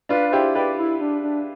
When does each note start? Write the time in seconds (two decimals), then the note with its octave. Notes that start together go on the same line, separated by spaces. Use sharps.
0.09 D4 F4 B4
0.28 B4
0.32 E4 G4 C5
0.55 G4 B4 D5
0.78 E4
1.01 D4
1.23 D4